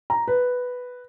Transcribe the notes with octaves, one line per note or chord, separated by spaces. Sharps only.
A#5
B4